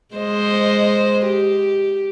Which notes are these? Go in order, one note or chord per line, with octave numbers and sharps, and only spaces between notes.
G#3 C5 D#5
G4